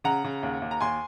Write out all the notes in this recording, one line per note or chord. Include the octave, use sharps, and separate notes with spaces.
C#3 F#5 A#5
C#3
D#2
D#2
A#5
D#2 G#5 C6